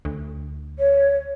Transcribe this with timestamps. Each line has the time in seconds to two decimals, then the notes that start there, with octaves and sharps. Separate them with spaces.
0.05 D2
0.79 C#5